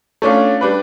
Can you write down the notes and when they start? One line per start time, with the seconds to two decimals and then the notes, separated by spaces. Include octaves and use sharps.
0.22 A3 C#4 D4 F4
0.61 G3 D4 B4